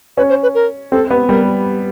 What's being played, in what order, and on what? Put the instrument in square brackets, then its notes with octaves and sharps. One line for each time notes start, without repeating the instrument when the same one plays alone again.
[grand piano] C#4 [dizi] B4
[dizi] C5
B4
A#4
[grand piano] C4 [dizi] A4
[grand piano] B3
[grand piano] G3 [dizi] A#4